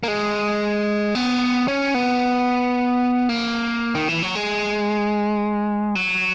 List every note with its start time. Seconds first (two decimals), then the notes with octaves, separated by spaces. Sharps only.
0.03 A#3
0.08 G#3
1.15 B3
1.68 C#4
1.94 B3
3.29 A#3
3.95 D#3
4.09 E3
4.22 F#3
4.35 G#3
5.95 F#3